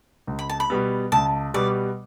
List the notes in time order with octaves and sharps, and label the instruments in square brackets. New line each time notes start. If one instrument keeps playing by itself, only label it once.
[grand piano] C#2
[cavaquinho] B5
A5
B5
[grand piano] B2 G3 B3
[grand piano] C#2 [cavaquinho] A5
[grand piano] B2 G3 B3 [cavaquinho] D5